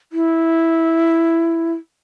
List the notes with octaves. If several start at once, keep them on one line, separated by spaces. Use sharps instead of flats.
E4